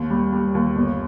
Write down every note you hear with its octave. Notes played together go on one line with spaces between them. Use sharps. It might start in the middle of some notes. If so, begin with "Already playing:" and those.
Already playing: D#2
G3
G3
D#2
G1